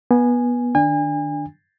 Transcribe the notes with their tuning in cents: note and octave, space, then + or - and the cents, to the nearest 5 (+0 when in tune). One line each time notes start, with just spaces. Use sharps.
B3 -20 G#5 +0
D#3 -25 D4 +0 G#5 -35